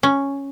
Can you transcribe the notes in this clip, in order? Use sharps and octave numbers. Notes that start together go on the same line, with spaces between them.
C#4